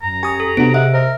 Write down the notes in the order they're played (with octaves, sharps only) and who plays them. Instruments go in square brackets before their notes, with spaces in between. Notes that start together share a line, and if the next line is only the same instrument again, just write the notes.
[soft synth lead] F#2 [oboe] A#5
[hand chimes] G4 [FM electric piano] G#5 D#6
[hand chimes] A4
[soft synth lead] C3 [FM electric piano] B3 D4 F#4 [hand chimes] D7
[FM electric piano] G#4 D#5 [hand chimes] E5 [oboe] F#5
[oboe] A#4 [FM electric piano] C5 D#5